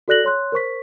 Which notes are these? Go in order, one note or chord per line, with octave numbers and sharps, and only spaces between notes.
F#4 A4 D5 F#6 A#6 F#7
C#5 C6 F#6
A#4 C5 C#6 B6